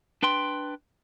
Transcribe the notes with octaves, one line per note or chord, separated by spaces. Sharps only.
D4 B4 G5 C6